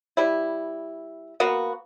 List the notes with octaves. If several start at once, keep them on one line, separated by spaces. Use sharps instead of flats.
G3 E4
A#3 B3 F#4